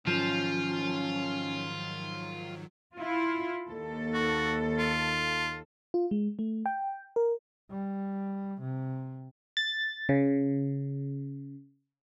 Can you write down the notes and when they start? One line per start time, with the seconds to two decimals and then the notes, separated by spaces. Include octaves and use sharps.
0.07 G#2 D#3 F3 F#3 C#4 F4
2.96 E4 F4
3.69 D#2 A4
4.14 F#4
4.78 F4
5.94 F4
6.11 G#3
6.39 A3
6.66 G5
7.16 A#4
7.71 G3
8.62 C3
9.57 A6
10.09 C#3